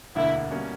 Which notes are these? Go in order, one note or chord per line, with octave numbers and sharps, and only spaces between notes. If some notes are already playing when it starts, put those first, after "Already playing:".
E1 D2 D3 A#3 E4
B2 G3 A#3 C#4